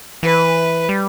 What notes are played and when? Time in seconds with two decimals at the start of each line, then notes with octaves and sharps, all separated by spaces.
0.23 E3 B4
0.89 G3